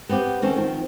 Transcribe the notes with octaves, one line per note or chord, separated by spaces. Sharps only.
B3 C4 F4 G4
D#3 C4 C#4 A4
D#3 F3 C4